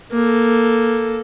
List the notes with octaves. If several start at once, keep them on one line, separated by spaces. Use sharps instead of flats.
A#3 A4